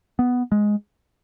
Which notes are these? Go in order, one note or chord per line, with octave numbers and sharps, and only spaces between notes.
B3
G#3